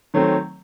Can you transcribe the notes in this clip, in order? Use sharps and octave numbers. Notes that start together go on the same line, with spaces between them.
D#3 F#3 A3 C4